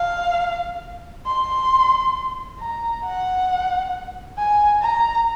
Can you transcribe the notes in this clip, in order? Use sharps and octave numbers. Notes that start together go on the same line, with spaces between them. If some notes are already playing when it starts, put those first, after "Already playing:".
Already playing: F5
C6
A#5
F#5
G#5
A#5